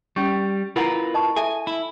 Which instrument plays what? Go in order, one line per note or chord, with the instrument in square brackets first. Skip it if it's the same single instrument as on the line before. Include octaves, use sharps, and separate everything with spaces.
[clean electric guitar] G3 [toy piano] C#4 C#6
[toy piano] E4 F#5 A#5 [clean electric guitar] F4 A#4 B4
[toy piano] D#5 A5 C#6
[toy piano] A4 E5 [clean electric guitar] G#5
[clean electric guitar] E4